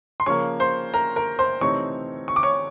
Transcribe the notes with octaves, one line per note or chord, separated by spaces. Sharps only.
C6
C#3 F3 A#3 C#5 C#6
C5 C6
A#4 A#5
A#4 A#5
C5 C6
C3 E3 A3 C4 D#4 C#5 C#6
C#6
D6
C#5 C#6